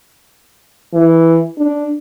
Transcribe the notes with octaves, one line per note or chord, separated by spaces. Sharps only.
E3
D4